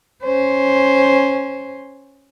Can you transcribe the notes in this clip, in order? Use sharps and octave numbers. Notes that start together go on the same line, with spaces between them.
C#4 C5